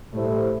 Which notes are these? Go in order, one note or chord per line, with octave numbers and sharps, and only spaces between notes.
A2 G3 E4 A4 C5